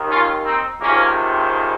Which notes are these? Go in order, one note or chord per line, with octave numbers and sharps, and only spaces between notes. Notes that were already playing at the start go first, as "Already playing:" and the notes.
Already playing: D#2 D#3
C#4 F4
C4 D#4
C#2 C3 D#3 A#3 C#4